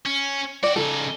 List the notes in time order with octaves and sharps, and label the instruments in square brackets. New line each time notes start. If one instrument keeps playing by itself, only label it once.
[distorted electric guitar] C#4
[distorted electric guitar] F#4 G4 [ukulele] D5
[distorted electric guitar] C#3 D#4 [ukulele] A4